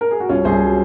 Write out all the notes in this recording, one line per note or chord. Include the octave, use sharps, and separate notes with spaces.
A#4
G#4
F#4
C2 C#4 F4
C2 G#4 C5
F#3